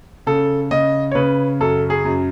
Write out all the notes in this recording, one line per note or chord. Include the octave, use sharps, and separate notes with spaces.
C#3 A4
C#3 D#5
C#5
C#3 B4
F#2 A4
G#4
F#2